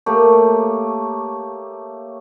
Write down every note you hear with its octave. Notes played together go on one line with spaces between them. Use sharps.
A3 A#3 G4 C#5